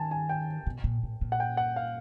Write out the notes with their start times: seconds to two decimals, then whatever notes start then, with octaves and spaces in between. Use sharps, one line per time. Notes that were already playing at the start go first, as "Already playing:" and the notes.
Already playing: D#3 G#5 A5
0.11 G#5
0.29 G5
0.67 B2
0.84 A#2
1.03 A2
1.21 A#2
1.32 F#5
1.40 G5
1.57 F#5
1.76 F5